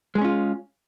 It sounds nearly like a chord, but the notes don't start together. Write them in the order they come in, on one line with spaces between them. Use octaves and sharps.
G#3 G#4 C#4 F4